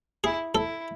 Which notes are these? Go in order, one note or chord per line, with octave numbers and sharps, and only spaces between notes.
E4 G#4
E4 A4